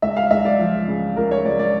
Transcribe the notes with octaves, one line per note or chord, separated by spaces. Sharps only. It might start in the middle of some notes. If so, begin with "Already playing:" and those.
C#2 E5
F5
C#2 E5
D5
F3
C#3
C#2 A#4
C#5
C#2 D5
D5